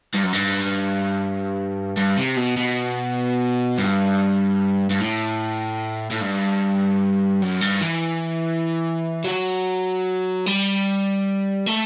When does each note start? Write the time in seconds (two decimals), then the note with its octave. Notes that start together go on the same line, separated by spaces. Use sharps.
0.14 G2
0.23 F#2
0.33 G2
1.97 G2
2.17 C3
2.36 B2
2.57 B2
3.78 G2
4.90 G2
5.00 A2
6.11 A2
6.21 G2
7.42 F#2
7.62 G2
7.82 E3
9.25 F#3
10.46 G3
11.67 A3